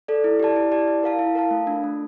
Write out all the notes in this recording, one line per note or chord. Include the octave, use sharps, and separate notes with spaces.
A4 D5
E4
G4 D5 A5
E4
G4 D5 A5
E4
A#4 F5 A5
E4
A#4 F5 A5
A3
D4 F4
A3